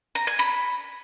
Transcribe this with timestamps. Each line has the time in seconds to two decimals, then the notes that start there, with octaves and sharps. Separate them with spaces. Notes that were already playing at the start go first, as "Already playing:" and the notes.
0.15 A#5
0.27 G#5
0.39 B5